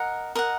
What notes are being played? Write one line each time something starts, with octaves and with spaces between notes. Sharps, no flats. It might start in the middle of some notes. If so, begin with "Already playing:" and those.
Already playing: A#4 D#5 F#5
A#4 D#5 F#5